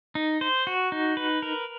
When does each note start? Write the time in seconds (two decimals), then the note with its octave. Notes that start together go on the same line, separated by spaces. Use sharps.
0.15 D#4
0.41 C5
0.67 F#4
0.92 D#4
1.17 B4
1.42 A#4